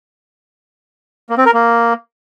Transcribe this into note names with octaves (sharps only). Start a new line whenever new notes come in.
A#3
C4
A#4
A#3